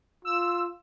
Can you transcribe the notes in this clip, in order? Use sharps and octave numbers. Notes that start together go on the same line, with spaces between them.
F4 E6